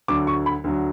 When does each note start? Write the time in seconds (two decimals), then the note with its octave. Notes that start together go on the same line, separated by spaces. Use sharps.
0.08 D2 D3 F#3 D6
0.27 C#6
0.46 B5
0.64 D2 D3 F#3